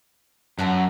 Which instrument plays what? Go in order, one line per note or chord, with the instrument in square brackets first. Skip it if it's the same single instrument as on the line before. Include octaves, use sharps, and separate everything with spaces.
[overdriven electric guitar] F#2 [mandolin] F#4 A4 F#5